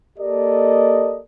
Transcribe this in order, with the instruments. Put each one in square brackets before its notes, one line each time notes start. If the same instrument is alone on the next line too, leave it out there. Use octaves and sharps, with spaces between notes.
[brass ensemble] A#3 G4 A4 A#4 D5 D#5